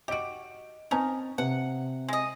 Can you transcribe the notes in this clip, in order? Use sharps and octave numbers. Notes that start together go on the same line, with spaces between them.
F#4 G4 D#5 D7
C4 C#4 D#4 A#4 G#5 A5
C3 F#5
G#3 D#5